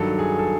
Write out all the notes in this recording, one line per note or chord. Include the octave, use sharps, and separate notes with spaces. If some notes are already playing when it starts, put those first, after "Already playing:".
Already playing: G2 D#3 F#3 A4
G#4
A4